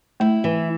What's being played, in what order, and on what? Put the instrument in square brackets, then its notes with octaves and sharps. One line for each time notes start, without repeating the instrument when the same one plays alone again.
[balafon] A3 [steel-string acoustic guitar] E4
[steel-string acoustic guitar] E3